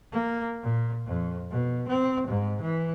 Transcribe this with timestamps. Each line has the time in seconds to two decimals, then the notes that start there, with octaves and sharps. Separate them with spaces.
0.12 A#3
0.62 A#2
1.06 F2
1.50 B2
1.88 C4
2.27 G#2
2.61 E3